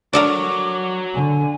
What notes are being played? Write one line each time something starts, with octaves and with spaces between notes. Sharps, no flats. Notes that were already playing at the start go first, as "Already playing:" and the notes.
D4 F#4 A4 A#4 C#5 D6
D3 G#5